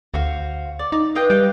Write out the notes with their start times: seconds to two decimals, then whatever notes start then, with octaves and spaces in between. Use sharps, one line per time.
0.14 D2 F#4 C5 F5
0.79 D5
0.92 D#4 D5
1.15 F4 B4 D#5 G5
1.30 G3 F5 G5